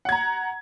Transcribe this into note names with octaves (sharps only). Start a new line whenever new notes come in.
F#5 A#5 G#6